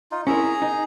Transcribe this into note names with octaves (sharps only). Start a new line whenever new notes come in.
D#4 F4
C#4 E4 G#4 A#4 A#5
D#4